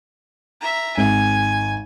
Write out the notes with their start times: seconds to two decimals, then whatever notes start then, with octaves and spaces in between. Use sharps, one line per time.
0.61 E5 A#5
0.98 G#1 G#5